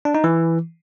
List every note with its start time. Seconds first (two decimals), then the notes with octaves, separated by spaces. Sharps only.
0.05 D4
0.15 D#4
0.24 E3